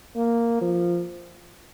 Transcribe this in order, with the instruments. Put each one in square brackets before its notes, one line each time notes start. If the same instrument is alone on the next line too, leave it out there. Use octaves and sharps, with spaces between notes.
[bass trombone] A#3
F3